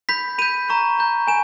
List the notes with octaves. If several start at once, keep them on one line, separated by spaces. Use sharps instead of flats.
B5 G6 B6
B5 G6 D#7
A#5 C#6 G6
A#5 C#6 G6
G#5 E7